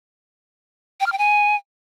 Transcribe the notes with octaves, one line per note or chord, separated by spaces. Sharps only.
G5
F6
G5
G#5